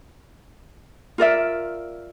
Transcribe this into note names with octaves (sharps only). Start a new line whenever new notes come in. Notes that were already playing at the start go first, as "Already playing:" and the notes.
F4 A#4 D5 E5